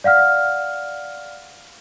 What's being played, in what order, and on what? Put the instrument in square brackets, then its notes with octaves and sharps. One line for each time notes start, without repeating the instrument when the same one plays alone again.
[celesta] D5 F5 F#5 F6